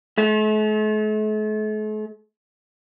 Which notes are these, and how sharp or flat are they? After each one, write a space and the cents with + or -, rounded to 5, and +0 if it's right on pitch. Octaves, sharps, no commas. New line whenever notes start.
A3 -45